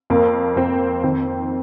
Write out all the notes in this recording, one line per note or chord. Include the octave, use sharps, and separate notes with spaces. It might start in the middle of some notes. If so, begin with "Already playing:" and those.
F2 A#3
F2 C4
D#3 C4